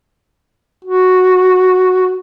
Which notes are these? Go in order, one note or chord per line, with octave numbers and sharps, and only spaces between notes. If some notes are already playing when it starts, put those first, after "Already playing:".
F#4